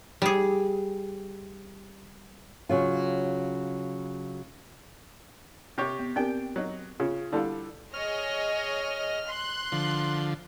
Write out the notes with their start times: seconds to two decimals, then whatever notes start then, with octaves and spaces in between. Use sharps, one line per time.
0.22 G3 G#4
2.69 C#3 F#3 F4
5.78 C3 G4 C#5
5.99 B3
6.16 C4 D4 G4 A#4 G5
6.56 F#3 D#4
7.00 C#3 F4
7.32 D3 G3 E4 A4 F5
7.94 G#4 C#5 D#5 F6
9.26 C6 F#6
9.72 D3 F3